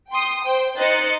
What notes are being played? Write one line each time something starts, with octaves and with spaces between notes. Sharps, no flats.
G5 C6 D#6
C5 G5
D#4 C5 D#5 F#6 A6 C#7